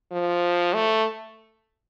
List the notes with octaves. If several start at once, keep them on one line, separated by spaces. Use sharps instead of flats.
F3
A3